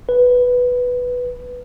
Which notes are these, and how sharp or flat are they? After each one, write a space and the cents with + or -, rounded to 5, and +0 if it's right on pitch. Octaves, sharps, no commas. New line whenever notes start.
B4 +0